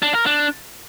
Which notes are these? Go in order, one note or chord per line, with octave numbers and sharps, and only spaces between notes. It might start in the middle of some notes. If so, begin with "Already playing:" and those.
D4
A#4
D4